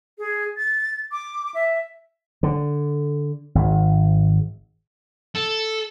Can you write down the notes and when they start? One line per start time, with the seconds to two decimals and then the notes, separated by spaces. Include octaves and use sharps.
0.18 G#4
0.57 A6
1.12 D6
1.54 E5
2.43 D3
3.55 G#1
5.35 A4